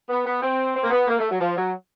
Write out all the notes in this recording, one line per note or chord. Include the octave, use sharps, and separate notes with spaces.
B3
B3
C4
C4
A#3
B3
A#3
A3
F#3
F3
F#3